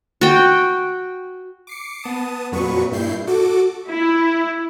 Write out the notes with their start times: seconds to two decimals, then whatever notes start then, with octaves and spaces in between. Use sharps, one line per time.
0.21 F#4 G5
1.67 D6 C7 C#7
2.03 B3 A5 D#6
2.52 F2 A#2 F#3 B4 C#6
2.91 G2 A#2 E4 G6 C7
3.27 F#4 A4 D6
3.88 E4